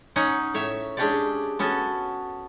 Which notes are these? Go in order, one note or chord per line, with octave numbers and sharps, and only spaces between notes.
C#4 D#4 C#5 F#5 G#5
A2 C#5 E5
G#3 C#4 D4 G4 C#5 D5
B3 C#4 F#4 A4